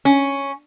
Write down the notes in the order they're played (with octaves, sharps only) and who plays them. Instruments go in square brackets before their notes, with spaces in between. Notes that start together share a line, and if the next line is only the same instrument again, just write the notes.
[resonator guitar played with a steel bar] C#4